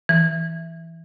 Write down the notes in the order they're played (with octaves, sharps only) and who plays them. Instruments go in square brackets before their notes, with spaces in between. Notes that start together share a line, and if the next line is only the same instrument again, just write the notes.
[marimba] E3